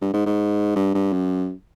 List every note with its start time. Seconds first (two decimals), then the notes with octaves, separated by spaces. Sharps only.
0.01 G2
0.14 G#2
0.26 G#2
0.76 G2
0.94 G2
1.13 F#2